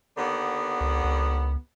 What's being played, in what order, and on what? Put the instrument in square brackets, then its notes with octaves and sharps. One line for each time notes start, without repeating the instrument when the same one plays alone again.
[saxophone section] D#2 D3 B3
[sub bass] C#2
C#2